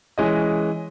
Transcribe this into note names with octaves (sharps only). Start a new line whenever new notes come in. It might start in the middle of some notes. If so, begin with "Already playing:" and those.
E3 G#3 C#4 D#5